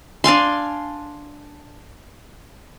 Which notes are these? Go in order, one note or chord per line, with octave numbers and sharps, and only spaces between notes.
D4 F5 G#5 C6